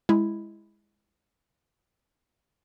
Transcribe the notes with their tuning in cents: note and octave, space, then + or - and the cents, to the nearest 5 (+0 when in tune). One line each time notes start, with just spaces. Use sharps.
G#3 -5 E4 +0